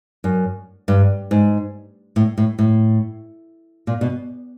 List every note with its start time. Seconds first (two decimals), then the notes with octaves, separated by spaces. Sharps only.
0.24 F#2
0.88 G2
1.31 G#2
2.16 A2
2.38 A2
2.59 A2
3.87 A#2
4.01 B2